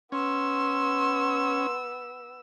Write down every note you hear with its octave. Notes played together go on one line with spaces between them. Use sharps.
B3 C#4 C6 E6